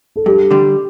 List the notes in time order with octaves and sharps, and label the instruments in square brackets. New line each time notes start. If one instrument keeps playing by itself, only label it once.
[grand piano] A4
[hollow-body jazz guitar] G2 [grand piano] G4
[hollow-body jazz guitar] D3 G3